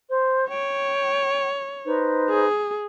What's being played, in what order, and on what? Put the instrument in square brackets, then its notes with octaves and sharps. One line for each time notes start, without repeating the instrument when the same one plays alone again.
[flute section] C5
[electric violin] C#5 [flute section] G5
[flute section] D#4 B4 C5
[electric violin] G#4